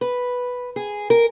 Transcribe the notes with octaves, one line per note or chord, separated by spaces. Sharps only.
B4
G#4
A#4